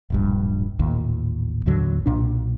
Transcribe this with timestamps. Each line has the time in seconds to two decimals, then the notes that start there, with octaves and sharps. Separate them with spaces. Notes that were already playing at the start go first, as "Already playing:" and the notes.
0.10 D1 A#1 G2
0.79 A1 D#2 A#2
1.66 A1 D#2 D3 F#3
2.06 B1 A#2 D4